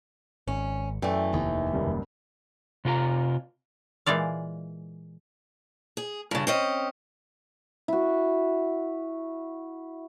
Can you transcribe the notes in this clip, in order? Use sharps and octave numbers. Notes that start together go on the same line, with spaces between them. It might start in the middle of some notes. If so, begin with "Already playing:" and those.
G#1 C#4
F#2 E3 A3 A4 D5 G5
F1 D#2 D#3
F#1 C#2 G2
C3 F4 A#4 A#5
A#2 E3 G#3 D5 F5
G#4
G2 C#3
C4 C#4 D#5
E4 F#4